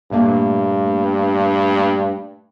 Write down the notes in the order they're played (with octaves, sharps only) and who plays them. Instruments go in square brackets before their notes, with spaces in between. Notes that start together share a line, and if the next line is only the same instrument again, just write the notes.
[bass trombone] G2 [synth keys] A#2 A3 A#3